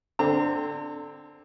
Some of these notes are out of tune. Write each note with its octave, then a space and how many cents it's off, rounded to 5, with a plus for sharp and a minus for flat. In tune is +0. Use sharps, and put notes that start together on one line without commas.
D3 +0 C4 +0 A#5 -40